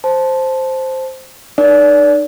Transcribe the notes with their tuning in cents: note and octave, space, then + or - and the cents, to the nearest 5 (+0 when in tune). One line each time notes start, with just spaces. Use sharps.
C5 +0 A5 -10
D#4 -40 A#4 +25 D5 -30